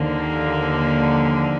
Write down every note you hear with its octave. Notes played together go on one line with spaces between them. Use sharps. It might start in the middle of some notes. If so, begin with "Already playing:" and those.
Already playing: D#2 D3 F3 A#3